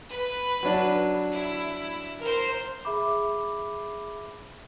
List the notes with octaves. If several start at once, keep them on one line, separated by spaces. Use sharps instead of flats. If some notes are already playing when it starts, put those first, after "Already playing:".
B4
F#3 D4
E4
A#4 C5
G#4 E5 B5 D6